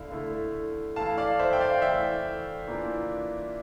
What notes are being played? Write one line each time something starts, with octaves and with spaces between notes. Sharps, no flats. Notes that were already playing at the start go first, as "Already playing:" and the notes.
Already playing: D3 A3 E4 F5
D3 A3 E4
E3 A3 E4 F5 A5
D5 F5
C5 E5
G5
D5 F5
E3 A3 E4 E5 G5
E3 A#3 D4 F4